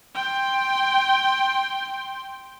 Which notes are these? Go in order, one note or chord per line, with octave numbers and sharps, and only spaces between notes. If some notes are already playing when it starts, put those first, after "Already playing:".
G5 C6